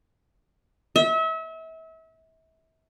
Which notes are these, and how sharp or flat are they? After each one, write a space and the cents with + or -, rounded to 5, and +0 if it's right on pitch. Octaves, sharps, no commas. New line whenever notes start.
E5 -35